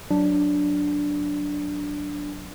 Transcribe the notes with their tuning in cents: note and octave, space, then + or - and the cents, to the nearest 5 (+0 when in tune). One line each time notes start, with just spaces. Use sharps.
F#3 +0 D4 +0